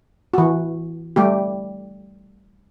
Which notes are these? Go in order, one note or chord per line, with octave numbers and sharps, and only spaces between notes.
E3 F#4
G3 A3 G4